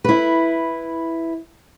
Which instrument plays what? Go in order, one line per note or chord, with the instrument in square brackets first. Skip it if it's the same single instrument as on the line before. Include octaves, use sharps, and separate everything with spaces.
[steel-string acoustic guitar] E4 B4